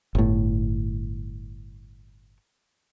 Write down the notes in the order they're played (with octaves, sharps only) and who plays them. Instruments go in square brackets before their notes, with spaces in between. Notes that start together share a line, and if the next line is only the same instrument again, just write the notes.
[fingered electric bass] G1 A2